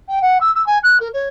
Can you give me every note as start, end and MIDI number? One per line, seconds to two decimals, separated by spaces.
0.08 0.19 79
0.21 0.37 78
0.40 0.51 88
0.55 0.64 88
0.66 0.78 80
0.83 0.97 90
1.00 1.08 70
1.13 1.28 73